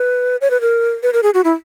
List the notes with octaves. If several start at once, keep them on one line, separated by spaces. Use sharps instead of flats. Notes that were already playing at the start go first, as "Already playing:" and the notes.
Already playing: B4
C#5
B4
A#4
B4
A#4
G#4
F#4
E4